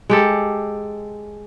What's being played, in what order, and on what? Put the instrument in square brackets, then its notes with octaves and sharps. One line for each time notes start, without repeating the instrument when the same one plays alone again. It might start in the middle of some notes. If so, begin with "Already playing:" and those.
[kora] G#3 G4 A4